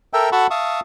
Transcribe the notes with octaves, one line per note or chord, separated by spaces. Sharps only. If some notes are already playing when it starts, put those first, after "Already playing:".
A4 A#4 E5 G5
F#4 A4 F#5 A5 B5 C#6
E5 F5 A5 C#6 D#6